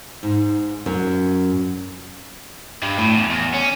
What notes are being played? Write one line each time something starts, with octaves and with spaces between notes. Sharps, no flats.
G#2
F#2
G2
A2
E2
E2
C#4